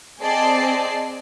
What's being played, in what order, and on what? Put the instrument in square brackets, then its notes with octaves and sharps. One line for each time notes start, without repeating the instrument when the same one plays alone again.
[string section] C4 G#4 D5 D#5 A5 C7